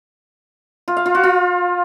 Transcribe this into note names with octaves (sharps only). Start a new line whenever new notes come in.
F4
F5
F4
F#4
F4